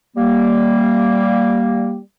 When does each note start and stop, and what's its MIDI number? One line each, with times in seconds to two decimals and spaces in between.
0.17 1.98 55
0.17 1.98 58